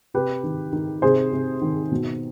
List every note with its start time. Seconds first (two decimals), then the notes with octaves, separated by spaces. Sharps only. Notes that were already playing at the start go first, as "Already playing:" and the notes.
0.14 C3 G4 B4
0.43 D#3
0.73 D#3
1.02 C3 G#4 C5
1.32 C3
1.61 D#3
1.92 B2